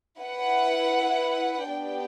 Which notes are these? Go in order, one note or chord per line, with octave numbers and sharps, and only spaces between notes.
E4 B4 F#5
B3 D4 G4 D5 G5